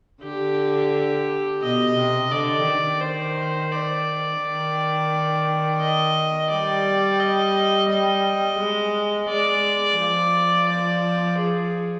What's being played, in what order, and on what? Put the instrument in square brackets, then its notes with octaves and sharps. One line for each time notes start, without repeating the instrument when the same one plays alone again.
[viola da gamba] D3 [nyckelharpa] G4
[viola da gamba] B2 [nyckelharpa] D#5
[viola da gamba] C3
[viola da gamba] D3 [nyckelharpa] D5
[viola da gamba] D#3
[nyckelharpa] C5
D5
[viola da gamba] D#3
[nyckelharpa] D#5
[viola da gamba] G3 [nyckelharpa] D5
[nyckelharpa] D#5
[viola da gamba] G3 [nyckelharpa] D#5
[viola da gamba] G#3
[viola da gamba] G#3 [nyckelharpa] D5
[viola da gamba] F3
[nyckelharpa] D5
G#4